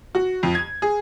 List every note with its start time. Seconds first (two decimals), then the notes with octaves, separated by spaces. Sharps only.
0.15 F#4
0.43 F2
0.55 G#6
0.82 G#4